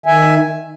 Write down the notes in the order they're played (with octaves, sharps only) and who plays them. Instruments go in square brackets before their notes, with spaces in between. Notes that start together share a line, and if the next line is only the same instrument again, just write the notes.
[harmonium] D#3 E5 G#5